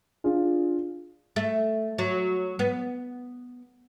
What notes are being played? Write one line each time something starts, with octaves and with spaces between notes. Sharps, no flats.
D4 F4 G#4
A3
F#3
B3